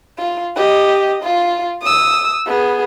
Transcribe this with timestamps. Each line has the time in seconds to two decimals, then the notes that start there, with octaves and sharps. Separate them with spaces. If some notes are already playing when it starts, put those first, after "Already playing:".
0.18 F4
0.56 G4 D#5
1.23 F4
1.82 D#6 E6
2.46 B3 G#4